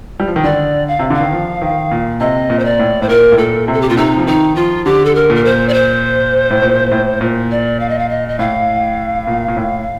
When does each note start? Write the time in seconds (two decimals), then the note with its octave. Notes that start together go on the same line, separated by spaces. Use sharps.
0.20 G3
0.28 F3
0.36 D#3
0.44 D3 D5
0.88 F5
0.99 C3
1.10 D3 F5
1.21 D#3
1.32 F3
1.62 D#3
1.91 A#2
2.20 C3 D#5
2.50 A#2
2.59 C5
2.65 D5
2.79 A2
3.02 A2 C5
3.09 A#2 A#4
3.32 A2
3.38 A#2 A4
3.68 C3
3.73 A4
3.81 G4
3.89 A#2 F4
3.97 C3 D#4
4.17 F3
4.27 D#3 D#4
4.56 F3 F4
4.85 D3 G4
5.05 A4
5.15 A#4
5.30 A#2
5.36 A#4
5.45 C5
5.69 D5
5.74 C5
6.51 A2
6.62 A#2
6.92 A2
7.21 A#2
7.51 D5
7.80 F5
7.89 D#5
7.99 F5
8.09 D#5
8.29 D#5
8.39 A2 F5
9.27 A#2
9.48 A#2
9.57 A2